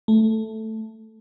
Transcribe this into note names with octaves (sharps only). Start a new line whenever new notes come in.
A3